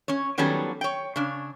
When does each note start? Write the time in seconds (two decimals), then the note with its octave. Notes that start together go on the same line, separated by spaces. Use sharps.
0.08 C#4 C#5
0.38 D#3 F#3 G3 B3 C#4 A4
0.81 C#5 G5
1.16 C#3 D4 C#5